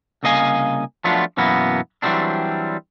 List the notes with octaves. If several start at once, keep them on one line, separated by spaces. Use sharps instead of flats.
C2 C#3 A#3 D#5 F5 G#5
F3 F#3 A3 B3 D4 F4
F#2 B2 E3 A#3 B3
E3 F#3 G3 A3 C4 D4